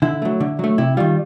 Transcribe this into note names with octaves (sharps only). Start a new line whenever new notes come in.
D3 E4
F#3 A3
D3
F#3 A3
C3 E4
D#3 G3 F4